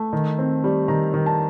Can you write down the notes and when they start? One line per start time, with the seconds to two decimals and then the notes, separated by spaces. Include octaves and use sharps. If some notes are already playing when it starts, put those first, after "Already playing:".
Already playing: A3
0.13 D#3
0.39 C4
0.64 G3
0.88 D#3 A#5
1.14 D#3
1.26 A5